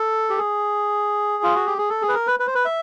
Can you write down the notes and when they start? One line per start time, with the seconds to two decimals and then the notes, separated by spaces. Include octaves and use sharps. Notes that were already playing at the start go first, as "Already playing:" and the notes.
Already playing: A4
0.30 G4
0.38 G#4
1.43 F4
1.55 F#4
1.66 G4
1.78 G#4
1.90 A4
2.02 G#4
2.09 B4
2.14 A#4
2.27 B4
2.40 B4
2.47 C5
2.55 B4
2.65 E5